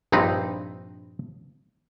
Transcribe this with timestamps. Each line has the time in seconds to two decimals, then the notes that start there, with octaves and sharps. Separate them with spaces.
0.12 A#1 G2 C4 D#4 B4